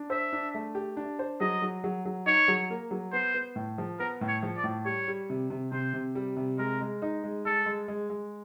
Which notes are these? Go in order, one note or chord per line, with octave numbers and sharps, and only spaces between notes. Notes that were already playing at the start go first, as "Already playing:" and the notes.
Already playing: D4
C5 E5
D4
A3
G4
D4
C5
F#3 D#5
F#3
F#3
F#3
D#4 C#5
F#3
A#3
F#3
B3 C5
B3
A2
F3
B3 A#4
A2
C#5
F3
D5
A2
G3 C#5
G3
C3
C3
C3 C5
C3
G3
C3
G#3 A#4
G#3
D#4
G#3
G#3 A4
G#3
G#3
G#3